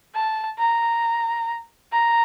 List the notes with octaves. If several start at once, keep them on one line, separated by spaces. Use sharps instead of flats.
A5
A#5
A#5